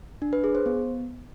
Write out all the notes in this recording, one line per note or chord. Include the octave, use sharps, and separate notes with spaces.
D4
B4
G#4
C5
B3